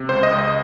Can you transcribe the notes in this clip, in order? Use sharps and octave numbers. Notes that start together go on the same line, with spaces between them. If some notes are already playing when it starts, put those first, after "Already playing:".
Already playing: C3
C#2 C5
D#5
C#2
D#5